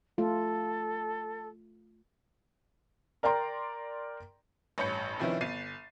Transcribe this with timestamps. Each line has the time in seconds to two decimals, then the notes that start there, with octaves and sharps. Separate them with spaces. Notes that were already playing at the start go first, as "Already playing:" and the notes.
0.18 A3 F4 A4
3.23 A#4 D5 G5 A#5 C6
4.78 A1 G2 C#5 B5 G6 C#7
5.19 C2 D#3 F3 C#4 E4 B4
5.41 G1 A6 C7 D#7